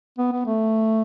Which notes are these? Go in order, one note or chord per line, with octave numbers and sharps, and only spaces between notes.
B3
B3
A3